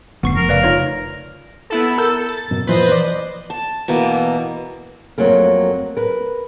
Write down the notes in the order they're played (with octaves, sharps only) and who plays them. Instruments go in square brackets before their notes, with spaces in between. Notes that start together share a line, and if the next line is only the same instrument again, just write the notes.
[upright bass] F1 [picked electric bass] D3 [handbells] B3 C#6 C7
[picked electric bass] F3 [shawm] A#4
[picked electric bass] C#3 [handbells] B4 D5 F5
[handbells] D#4 F4 C#5
[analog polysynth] B3 E4 A4
[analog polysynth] A4 [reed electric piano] A#4 E6 G6
[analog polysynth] A6
[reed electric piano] F#2 B2
[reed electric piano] A#2 E3 F3 [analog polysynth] B4 C5 D#5
[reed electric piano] D5
[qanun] A5
B2 E3 A#3 D6
[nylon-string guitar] F2 A#2 F#3 A3 A#3 A#4
A#4 B4